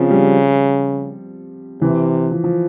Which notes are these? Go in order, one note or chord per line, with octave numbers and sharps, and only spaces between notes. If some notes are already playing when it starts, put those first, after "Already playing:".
Already playing: C#3 F3 C4
G3
C3 E3
F3
F3